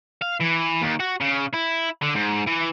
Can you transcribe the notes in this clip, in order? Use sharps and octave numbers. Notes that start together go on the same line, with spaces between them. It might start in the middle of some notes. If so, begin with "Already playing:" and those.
F5
E3
D#2
F#4
C#3
E4
D3
G#2
E3